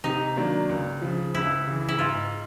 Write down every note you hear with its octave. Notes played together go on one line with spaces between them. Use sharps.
C3 D#4
D#3 F#3 A#3 D4
C#2
C#3 F3
C#2 E4
C#3 E3
E4
G#2 F4